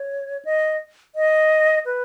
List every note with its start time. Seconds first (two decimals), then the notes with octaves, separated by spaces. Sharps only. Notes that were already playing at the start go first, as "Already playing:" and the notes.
Already playing: C#5
0.45 D#5
1.15 D#5
1.86 B4